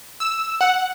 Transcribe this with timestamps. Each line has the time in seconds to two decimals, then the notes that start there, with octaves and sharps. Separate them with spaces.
0.20 E6
0.61 F#5